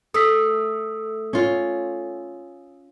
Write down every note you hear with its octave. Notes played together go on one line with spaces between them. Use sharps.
A3 A4 D#6 E6 B6
C#4 F4